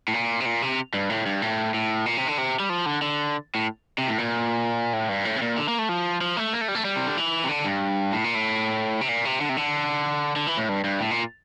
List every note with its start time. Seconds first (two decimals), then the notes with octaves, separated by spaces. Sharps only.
0.08 A2
0.14 A#2
0.40 C3
0.46 A#2
0.62 C3
0.94 G2
1.10 A2
1.26 G2
1.42 A2
1.74 A2
2.06 A#2
2.17 C3
2.28 D3
2.38 C3
2.60 G3
2.69 F3
2.86 D3
3.02 D3
3.55 A2
3.98 C3
4.08 A2
4.18 A#2
4.93 A2
5.09 G2
5.25 A2
5.36 C3
5.42 A#2
5.57 D3
5.68 A#3
5.79 A3
5.89 F3
6.21 F3
6.37 A3
6.53 A#3
6.61 A3
6.68 G3
6.75 A3
6.85 G3
6.96 C3
7.07 D3
7.17 E3
7.44 C3
7.49 D3
7.64 G2
8.12 A2
8.24 A#2
8.35 A2
9.01 C3
9.09 A#2
9.25 C3
9.41 D3
9.49 C3
9.57 D3
10.36 D3
10.47 E3
10.57 A2
10.69 G2
10.84 G2
11.00 A2
11.11 A#2